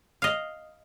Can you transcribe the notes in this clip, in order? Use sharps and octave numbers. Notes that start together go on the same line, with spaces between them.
D#5 F5